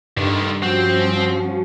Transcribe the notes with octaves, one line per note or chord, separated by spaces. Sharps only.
G2 D3 D#3
F3 C4 C#4 F#4